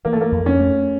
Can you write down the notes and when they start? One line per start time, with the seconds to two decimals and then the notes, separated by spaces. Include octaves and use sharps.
0.05 E3 A#3
0.13 A3
0.21 A#3
0.32 F2
0.46 C#4
0.60 A3